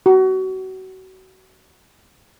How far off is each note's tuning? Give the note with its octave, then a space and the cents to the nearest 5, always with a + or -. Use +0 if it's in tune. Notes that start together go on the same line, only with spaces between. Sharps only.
F#4 +30